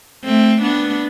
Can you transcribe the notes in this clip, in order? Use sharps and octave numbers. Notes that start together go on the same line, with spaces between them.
A3 C4
B3 D4